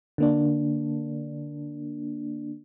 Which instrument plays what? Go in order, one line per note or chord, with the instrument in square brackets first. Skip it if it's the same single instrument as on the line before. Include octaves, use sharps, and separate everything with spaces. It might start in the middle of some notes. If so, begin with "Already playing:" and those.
[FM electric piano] D3 A#3 D4